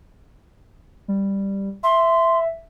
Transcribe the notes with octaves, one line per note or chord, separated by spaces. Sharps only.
G3
E5 C6